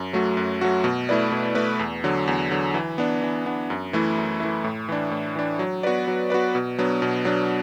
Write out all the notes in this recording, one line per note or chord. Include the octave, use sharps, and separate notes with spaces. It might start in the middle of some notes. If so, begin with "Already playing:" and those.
Already playing: F#2
F#3 A3 F#4
F#2
F#3 A3 F#4
B2
A3 E4 B4 D5
B2
A3 E4 B4 D5
E2
D3 F#3
E2
D3 F#3
E3
B3 D4
E3
B3 D4
F#2
E3 A3 E4
F#2
E3 A3 E4
A2
E3 D4
A2
E3 D4
F#3
B3 F#4 B4 D5
F#3
B3 F#4 B4 D5
B2
F#3 B3 D4
B2
F#3 B3 D4